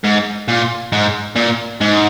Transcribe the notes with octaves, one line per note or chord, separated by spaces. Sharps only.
G#2
A#2
G#2
A#2
G#2